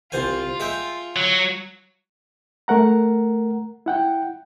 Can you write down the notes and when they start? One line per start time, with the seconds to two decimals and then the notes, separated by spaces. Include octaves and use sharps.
0.12 C2 F4 C5 G#5
0.60 G#3 E5 G5
1.16 F#3
2.68 A3 A#4 F#5 A#5
3.86 E4 F#5 G5